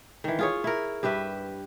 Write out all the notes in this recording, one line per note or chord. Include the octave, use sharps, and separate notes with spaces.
D#3 E3
F4 G#4 C#5
E4 A#4
G2 G4 B4 E5